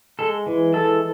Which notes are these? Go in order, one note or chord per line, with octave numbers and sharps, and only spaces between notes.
G#3 A4
E3
G#3 A4